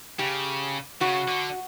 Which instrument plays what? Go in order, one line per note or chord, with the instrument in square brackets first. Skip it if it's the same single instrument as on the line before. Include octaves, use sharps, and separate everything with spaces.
[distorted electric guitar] C#3 [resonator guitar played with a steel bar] G4
[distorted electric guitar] C#3 [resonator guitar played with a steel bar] F#4
[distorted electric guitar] D3